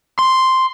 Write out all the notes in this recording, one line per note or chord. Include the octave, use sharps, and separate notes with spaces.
C6